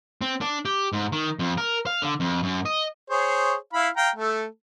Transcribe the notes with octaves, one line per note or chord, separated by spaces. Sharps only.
C4
D4
G4
G#2
D#3
F2
A#4
F5
D3
F2
F#2
D#5
G#4 C5 C#5
E4 F5 B5
F5 G5 A#5
A3 A4